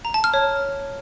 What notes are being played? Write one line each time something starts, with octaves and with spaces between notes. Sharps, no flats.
A#5
A5
F6
C#5